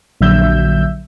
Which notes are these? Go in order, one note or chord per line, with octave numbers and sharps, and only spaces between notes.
A#1 D3 F#3 E5 E6 G6